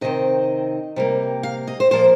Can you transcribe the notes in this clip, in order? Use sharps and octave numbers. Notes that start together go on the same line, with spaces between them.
C3 D#3 C4 D#5
C3 G3 A#3
F5
D#5
C5
A#2 F3 A#3 C5